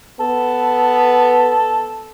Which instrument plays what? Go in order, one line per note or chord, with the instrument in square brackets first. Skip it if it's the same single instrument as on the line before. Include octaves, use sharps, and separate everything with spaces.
[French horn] B3 [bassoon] A4